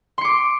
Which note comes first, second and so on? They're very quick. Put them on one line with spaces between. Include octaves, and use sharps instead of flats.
C6 C#7 D6